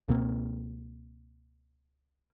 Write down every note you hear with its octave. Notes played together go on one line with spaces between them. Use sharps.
C#2 B2 A#3 C4